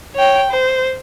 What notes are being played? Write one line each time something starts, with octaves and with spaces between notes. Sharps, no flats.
C#5 G5
C5